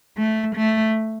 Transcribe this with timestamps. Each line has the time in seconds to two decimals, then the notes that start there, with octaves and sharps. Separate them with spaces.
0.18 A3
0.56 A3